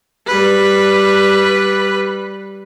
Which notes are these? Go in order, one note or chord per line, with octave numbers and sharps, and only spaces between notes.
G3 B4